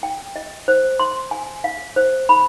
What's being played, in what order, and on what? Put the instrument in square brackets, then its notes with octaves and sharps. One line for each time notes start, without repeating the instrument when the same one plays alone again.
[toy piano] G5
D#5
C5
C6
G#5
F5
C5
B5